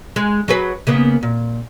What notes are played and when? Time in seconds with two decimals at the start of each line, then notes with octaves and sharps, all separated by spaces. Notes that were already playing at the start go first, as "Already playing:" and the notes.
0.16 G#3
0.48 F#3 G#4 B4
0.87 C#3 A#3 B3
1.23 A#2